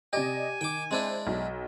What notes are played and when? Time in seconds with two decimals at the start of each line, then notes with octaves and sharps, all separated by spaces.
0.13 C3 G4 D5 D#5 G#5
0.61 D#3 G5 D6
0.91 G#3 C4 D4 E4 C5
1.27 B1